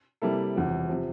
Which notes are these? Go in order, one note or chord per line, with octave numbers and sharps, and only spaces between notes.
C3 G3 A#3 E4 A4
E1 E2 C3 F3
C3 F3